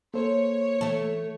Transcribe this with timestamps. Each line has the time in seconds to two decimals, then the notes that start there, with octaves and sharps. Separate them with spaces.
0.14 A#3 A4 C5 C#5
0.81 E3 A3 A4